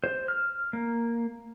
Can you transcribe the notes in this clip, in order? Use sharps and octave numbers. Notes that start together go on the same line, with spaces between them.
C5
F6
A#3